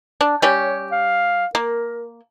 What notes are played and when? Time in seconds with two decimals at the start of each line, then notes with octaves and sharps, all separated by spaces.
0.21 D4
0.42 G3 C#4 G4 C#5
0.92 F5
1.55 A#3 A#4